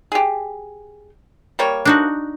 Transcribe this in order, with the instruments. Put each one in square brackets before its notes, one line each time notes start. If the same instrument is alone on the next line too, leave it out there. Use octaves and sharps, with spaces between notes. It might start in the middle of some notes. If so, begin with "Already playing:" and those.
[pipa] G4 G#4
G3 A#3 C#5
[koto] D4 D#4 F#4